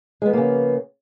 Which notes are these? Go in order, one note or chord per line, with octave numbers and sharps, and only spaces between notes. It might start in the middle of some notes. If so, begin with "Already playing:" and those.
C#3 F3 G#3 A#3 B3